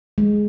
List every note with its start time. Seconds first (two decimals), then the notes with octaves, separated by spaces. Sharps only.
0.18 G#3